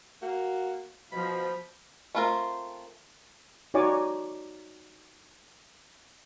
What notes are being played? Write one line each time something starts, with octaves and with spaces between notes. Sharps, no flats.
A#3 F#4
B2 F3 B5
A3 C4 F4 A4 A#4
D#4 F#4 C#5 D5 G#5 D6